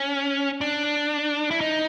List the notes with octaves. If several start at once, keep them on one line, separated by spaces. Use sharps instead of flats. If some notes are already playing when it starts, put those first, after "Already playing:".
Already playing: C#4
D4
E4
D#4